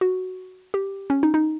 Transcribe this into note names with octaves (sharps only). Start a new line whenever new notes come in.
F#4
G4
C#4
D#4
D#4